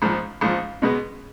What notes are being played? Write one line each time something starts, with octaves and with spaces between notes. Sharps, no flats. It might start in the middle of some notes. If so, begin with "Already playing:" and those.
A#1 G#2 F3
A#1 G#2 F3
B2 G#3 B3